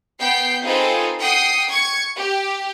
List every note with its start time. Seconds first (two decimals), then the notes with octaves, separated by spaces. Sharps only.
0.20 B3 G5 G6 C7
0.64 C4 D#4 F4 G#4 A4 B4
1.21 F#5 G5 D#6 C7
1.70 C#6 G#6 C#7
2.17 G4